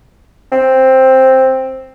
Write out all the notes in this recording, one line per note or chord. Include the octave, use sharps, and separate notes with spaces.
C4